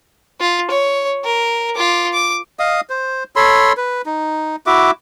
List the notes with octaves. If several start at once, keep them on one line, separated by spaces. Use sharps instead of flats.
F4
C#5
A#4
F4 D6
D6
D#5 F5 D#6
C5
A4 C#5 B5 C6
B4
D#4
E4 F#4 E5 D6